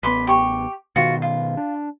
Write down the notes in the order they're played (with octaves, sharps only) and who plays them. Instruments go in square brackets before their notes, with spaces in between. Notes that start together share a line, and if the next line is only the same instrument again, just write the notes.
[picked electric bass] A1 B3 [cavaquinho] B4 C6 D6
[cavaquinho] G4 C#6
[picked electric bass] B2 D#3 B3 [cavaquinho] F4 F#4
[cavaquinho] F4
[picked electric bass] D4